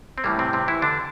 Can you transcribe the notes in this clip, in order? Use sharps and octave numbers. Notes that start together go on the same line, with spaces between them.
C4
A2 E3 G3 A#3
C3 C4
C3 C4
E3 E4
D3 D4